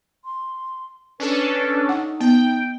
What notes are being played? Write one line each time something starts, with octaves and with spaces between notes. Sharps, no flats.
C6
C#4 D4 A4 B4
D#4 F#5
B3 G5